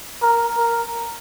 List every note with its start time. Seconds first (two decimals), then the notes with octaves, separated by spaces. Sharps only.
0.22 A#4
0.57 A#4